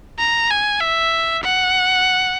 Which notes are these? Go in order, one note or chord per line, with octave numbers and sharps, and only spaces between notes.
A#5
G#5
E5
F#5